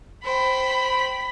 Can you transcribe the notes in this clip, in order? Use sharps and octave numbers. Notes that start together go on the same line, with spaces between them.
C5 G5 B5